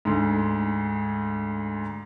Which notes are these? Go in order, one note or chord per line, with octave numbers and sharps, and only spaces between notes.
D2 G#2